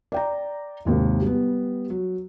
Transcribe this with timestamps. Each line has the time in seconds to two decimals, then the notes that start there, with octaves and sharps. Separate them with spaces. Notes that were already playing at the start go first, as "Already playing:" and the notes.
0.12 D5 G5 A#5
0.85 G#1 D#2 C3
1.22 G3 B3
1.90 F#3